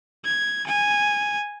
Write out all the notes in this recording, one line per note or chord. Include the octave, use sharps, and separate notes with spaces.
G#6
G#5